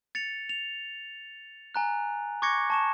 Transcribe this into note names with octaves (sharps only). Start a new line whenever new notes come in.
A6 C#7 F7
F7
G#5 A#5 F#6
C#6 D6 F#6 G#6 A#6 C#7
A5 C#6 E7